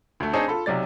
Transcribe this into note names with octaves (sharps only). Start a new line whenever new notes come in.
D2 A3
C4 D4 D#4 G#4 C#5
F4 A4 B5
B1 C3 F#3 D5 A6